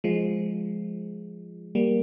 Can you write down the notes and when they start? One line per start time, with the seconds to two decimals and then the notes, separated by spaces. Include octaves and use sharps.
0.04 F3 G#3
1.75 G3 A#3